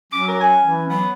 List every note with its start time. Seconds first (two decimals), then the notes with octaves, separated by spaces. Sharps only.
0.12 F#3 C#4 D6
0.28 A#4
0.40 G#5
0.61 E3
0.89 F#3 B3